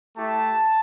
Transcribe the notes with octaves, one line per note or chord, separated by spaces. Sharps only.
A3 E4 G4 A5